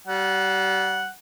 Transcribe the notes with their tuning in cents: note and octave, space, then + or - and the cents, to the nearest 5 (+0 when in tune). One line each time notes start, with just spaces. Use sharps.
G3 -30 F#5 +0